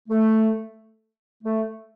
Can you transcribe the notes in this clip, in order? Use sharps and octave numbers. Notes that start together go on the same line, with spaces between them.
A3
A3